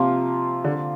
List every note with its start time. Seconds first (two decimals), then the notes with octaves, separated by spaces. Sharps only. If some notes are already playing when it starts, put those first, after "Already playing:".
Already playing: C3 F3 A#3 F4
0.64 D3